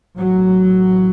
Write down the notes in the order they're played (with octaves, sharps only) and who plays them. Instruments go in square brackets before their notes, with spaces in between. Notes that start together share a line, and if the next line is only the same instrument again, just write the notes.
[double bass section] A1 A2 F#3